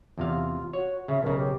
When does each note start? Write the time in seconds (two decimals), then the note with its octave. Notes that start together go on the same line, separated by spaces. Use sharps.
0.18 E2 C3 F4 F5
0.73 F#4 C#5
1.08 C#3 E5
1.23 B1 C#3 A#4
1.37 G4